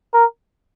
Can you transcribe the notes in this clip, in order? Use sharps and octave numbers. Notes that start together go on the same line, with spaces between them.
A#4